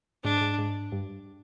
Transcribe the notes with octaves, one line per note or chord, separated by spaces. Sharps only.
G#2 D4
G#2
G#2
G2